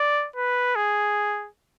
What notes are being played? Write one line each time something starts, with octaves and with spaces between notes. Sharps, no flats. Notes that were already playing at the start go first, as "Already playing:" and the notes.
Already playing: D5
B4
G#4